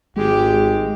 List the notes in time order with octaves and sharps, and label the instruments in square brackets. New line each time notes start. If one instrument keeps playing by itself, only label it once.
[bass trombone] G#1 [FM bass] G#3 [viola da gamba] G4